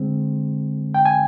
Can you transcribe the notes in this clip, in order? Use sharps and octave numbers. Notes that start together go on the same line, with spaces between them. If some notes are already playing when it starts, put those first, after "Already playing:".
Already playing: D3 G#3 C4
G5
G#5